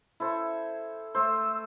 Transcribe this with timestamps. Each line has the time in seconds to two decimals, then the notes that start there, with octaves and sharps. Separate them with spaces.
0.20 E4 A4 C5
1.15 A3 C5 E6